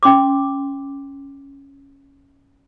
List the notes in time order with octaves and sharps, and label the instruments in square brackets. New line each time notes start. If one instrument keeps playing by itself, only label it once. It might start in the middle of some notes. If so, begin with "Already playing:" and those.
[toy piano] C#4 C6 D6